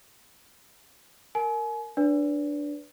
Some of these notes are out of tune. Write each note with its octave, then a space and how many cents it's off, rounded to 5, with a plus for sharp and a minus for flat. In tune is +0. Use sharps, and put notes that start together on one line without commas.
A#4 -10 G#5 +35
D4 +0 B4 +0 D5 -40